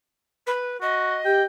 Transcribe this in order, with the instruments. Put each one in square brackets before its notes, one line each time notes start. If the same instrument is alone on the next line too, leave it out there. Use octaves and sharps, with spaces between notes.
[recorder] B4
[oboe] F#4 [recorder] D#5
[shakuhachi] G4 [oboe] G5